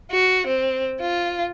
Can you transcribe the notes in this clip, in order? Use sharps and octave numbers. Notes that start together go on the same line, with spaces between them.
F#4
C4
F4